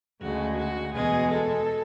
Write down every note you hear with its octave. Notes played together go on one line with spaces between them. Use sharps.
D2 C#3 G#3 F#4
F#4
E2 B2 G#3 G#4
A4